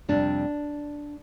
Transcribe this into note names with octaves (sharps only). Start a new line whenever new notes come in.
F2 C3 G3 D4